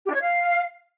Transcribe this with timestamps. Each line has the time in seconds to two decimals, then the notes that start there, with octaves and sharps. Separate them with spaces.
0.04 G4
0.10 D4
0.15 C#5
0.21 F5